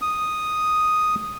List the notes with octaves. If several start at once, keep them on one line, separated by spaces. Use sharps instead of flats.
D#6